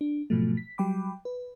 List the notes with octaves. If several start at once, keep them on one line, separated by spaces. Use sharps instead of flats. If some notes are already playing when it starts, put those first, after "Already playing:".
D4
G#2 B2 F3 F#3 A3
B6
F#3 G3 G5 B5 D6
B4